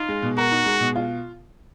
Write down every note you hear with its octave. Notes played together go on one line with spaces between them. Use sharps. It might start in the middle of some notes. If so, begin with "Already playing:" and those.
Already playing: D#4 F4
G#3
B2
F#4 A#4
D#4
G#3
B2
F4